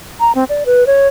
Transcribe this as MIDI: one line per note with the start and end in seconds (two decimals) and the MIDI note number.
0.20 0.32 82
0.35 0.44 60
0.49 0.64 74
0.66 0.86 71
0.87 1.08 73